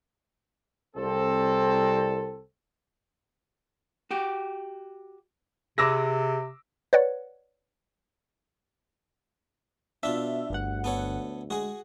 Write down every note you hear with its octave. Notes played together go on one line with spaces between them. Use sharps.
C2 C4 A4
F#4 G4
C3 G#4 B4 D6 E6 A#6
B4 C#5 D5 F#5
B2 D4 F4 E5
G1 D2 G2 F#5
B3 A4 C#5
G#3 F#4 G#4